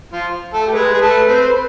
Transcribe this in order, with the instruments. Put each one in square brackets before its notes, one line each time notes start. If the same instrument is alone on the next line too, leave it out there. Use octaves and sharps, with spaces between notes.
[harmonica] F3 F4
A3 A4
G4
[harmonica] G#3 G#4 [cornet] B4
[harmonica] G#4
A3 A4
C4 C5